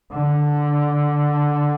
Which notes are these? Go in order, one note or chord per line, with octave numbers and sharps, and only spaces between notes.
D3